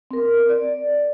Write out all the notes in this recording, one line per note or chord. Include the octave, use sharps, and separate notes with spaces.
C4 A#4
D5